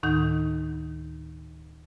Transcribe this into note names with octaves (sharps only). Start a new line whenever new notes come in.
D2 A2 D#3 D#4 G6